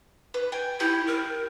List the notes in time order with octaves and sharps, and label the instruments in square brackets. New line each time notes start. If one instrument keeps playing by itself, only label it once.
[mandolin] B4
G5 G#5
[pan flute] E4 [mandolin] G4
[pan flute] A#4